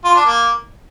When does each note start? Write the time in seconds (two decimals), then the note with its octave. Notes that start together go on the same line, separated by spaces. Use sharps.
0.05 F4
0.15 D4
0.26 A#3